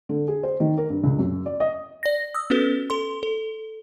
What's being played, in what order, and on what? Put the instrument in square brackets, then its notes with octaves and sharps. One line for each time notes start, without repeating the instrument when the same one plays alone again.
[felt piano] D3
G#4
C5
D#3
A#4
G2
C#2
F#2
D5
D#5
[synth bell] D5 A#6
D#6 E6
B3 C#4 F#4 A4 B4
A4 C6
A4